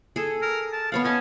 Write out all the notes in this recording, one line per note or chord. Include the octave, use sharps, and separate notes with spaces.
G#4 A4
A#4
A5
B3 C#5 F5 F#5
C#4 D#5 G#5 A5